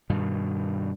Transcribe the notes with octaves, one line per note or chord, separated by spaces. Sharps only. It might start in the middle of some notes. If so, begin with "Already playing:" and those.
G2 B2 D#3